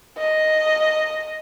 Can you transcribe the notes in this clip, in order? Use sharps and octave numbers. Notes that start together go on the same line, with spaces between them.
D#5